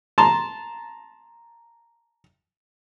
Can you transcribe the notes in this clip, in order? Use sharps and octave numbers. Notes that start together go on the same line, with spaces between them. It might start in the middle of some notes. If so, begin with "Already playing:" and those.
A5 A#5 C6